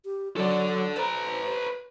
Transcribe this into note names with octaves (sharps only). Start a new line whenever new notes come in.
G4
F#3 A4 D5
B4 C5 A#5